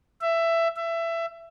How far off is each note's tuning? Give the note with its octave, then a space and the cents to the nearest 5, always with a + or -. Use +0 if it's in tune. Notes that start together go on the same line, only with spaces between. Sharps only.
E5 +15
E5 +20